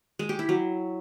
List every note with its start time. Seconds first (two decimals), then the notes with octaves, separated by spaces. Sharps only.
0.19 G#3
0.29 G4
0.39 E4
0.49 F#3